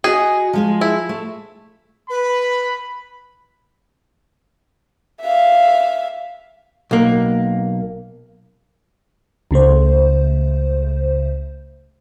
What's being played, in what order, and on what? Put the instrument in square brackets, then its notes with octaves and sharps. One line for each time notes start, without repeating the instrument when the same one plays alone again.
[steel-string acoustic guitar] F#4 D#5 [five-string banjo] G#4
[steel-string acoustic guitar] F3 G#3 G#4
[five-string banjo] E4
[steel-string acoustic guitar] A3
[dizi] B4 [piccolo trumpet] B5
[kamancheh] E5 F5
[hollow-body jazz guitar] B1 A#3
[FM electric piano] C#2 C#3 A3 C5